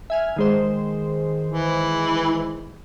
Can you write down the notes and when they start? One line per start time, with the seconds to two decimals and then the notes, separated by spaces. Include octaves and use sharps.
0.10 E5 G#5 F6
0.36 D#3 G#3 C5
1.48 E3